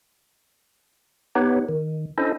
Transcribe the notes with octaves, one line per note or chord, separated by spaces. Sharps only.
B3 D#4 G4 B4 C#5
D#3
C#4 D4 E4 A4 C5 D#5